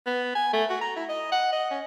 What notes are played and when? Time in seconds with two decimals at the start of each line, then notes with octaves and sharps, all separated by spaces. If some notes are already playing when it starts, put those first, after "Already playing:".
0.07 B3
0.35 G#5
0.53 A3
0.70 F#4
0.81 A#5
0.96 E4
1.09 D#5
1.32 F#5
1.53 D#5
1.71 C#4